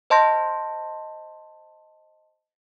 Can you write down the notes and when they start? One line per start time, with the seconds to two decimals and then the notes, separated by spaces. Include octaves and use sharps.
0.10 C5 D#5 A5 C6 G6 A#6